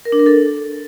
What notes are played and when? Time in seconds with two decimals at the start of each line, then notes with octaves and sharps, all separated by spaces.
0.05 A#4
0.12 D4
0.19 A#4
0.26 A4